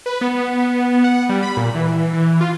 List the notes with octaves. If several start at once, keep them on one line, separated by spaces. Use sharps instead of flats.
B4
B3
F#5
G3
B5
A#2
E3
E3
F4